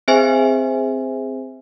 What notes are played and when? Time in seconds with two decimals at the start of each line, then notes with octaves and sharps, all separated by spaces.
0.08 C4 G#4 C5 E5 G#5